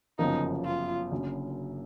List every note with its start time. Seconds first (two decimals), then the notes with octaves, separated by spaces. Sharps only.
0.19 G1 F#2 C#3 F3 A#3 D#4
0.65 F4
1.12 F#1 F#2 D3